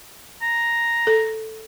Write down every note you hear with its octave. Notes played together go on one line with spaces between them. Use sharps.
A#5
A4